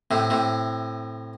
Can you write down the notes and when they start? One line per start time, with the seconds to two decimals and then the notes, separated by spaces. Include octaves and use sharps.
0.11 A2 C3
0.30 A2 C3